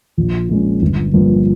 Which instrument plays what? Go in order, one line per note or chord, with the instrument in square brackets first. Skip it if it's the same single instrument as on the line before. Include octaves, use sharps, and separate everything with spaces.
[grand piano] A#1
A#2 G#3 C#4
G1
G2 F3 A#3